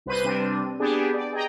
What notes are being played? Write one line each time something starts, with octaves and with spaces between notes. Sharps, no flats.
C2 B4 C5 D#7
C3 G3 C4 D4
B3 D4 G4 G#4
D5
G#4 D#5 G5 A#5